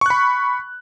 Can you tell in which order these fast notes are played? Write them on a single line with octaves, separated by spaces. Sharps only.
C#6 F#6 B5